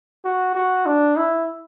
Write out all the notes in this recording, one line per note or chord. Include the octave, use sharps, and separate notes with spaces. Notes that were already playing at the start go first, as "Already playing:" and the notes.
F#4
F#4
D4
E4